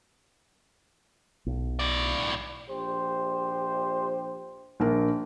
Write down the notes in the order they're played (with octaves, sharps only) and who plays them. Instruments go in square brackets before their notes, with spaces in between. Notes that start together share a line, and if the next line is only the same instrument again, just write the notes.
[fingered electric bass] B1
[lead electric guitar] A2 D5
[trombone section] A#1 G4 C5
[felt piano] A#1 D4 A#4